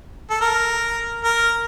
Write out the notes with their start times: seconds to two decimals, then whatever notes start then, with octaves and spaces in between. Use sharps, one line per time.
0.30 A4
0.41 A#4
1.24 A#4